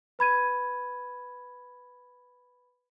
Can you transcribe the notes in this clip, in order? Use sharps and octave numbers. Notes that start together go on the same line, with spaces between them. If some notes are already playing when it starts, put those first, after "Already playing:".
B4 B5 G#6 D#7